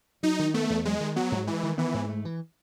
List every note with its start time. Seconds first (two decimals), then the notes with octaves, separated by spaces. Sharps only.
0.23 F#3 D#4
0.39 D#3
0.54 A3 B3
0.70 E2
0.85 F#3 G#3
1.00 D#3
1.16 F#3 B3
1.32 G#2
1.47 E3 G#3
1.63 D#3
1.78 E3 B3
1.94 G#2
2.09 A3
2.25 E3